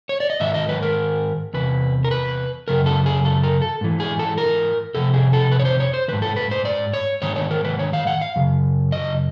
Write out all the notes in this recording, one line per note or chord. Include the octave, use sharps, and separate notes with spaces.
C#5
D5
D#5
G#2 D#3 E5
D#5
B4
A#4
E2 C3 B4
A#4
B4
F#2 C#3 A#4
A4
G#4
A4
A#4
A4
G#2 E3
G#4
A4
A#4
F2 C3 A4
G#4
A4
B4
C#5
C5
C#5
C5
G#2 D#3 B4
A4
B4
C5
D5
C#5
G#2 D#3 C#5
C#5
A#4
B4
C#5
F5
F#5
F5
F#2 C#3
D#5